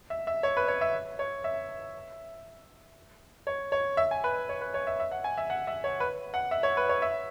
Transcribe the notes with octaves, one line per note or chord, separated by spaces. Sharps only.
E5
E5
C#5
B4
C#5
E5
C#5
E5
C#5
C#5
E5
G#5
B4
C#5
B4
C#5
E5
E5
F#5
G#5
E5
F#5
E5
C#5
B4
F#5
E5
C#5
B4
C#5
E5